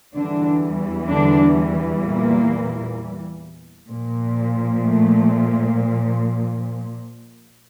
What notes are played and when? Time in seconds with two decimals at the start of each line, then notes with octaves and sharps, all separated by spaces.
0.16 E2 D3 E3 G3 D4
1.09 D3 D4
2.03 A#2 A#3
3.89 A#2 F3
4.82 A3